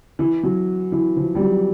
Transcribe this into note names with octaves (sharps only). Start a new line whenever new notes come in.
E3
F#3
E3
F3
G3
F#3